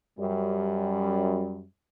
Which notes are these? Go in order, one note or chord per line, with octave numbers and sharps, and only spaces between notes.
F#2 G3